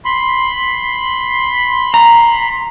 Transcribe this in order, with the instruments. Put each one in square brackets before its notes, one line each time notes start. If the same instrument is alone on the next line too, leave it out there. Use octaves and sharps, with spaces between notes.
[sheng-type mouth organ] B5 C6
[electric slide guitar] A#5